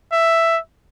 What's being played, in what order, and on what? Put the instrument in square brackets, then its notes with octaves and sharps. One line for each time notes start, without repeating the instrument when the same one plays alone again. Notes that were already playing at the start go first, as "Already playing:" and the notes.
[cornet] E5